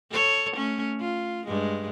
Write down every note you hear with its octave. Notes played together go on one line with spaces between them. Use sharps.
A4 C#5
A3 C#4
F4
G2 G#3